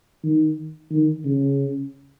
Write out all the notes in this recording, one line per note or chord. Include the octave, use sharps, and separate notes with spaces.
D#3
D#3
C#3